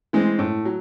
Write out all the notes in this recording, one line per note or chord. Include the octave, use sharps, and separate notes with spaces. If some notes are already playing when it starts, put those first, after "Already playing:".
E3 G#3 C4
A2
F#3